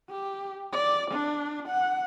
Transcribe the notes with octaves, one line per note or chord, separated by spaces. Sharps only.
G4
D5
D4
F#5